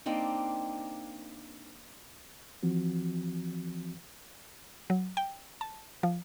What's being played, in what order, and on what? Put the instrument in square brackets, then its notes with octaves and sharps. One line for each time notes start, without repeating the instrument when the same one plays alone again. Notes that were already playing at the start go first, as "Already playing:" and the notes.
[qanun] A#3 C4 D4 D#4
[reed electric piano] E3 F3 C4 F#4
[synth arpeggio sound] F#3
G5
A5
F3